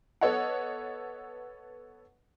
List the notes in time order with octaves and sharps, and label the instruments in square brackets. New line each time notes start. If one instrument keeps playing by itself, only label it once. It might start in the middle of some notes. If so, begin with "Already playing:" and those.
[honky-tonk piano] B3 A4 C#5 D#5 F#5